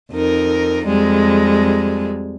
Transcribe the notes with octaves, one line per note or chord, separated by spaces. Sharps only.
F2 D#4 A#4
F2 G3 G#3